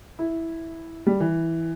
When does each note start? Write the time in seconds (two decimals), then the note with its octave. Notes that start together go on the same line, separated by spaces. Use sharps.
0.19 E4
1.07 G3
1.20 E3